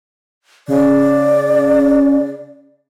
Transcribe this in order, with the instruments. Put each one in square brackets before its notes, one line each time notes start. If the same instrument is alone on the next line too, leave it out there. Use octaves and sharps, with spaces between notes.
[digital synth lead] C#3 [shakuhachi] D5